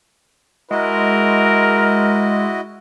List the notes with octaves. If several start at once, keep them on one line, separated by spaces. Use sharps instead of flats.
G#3 E4 F#4 A#4 D#5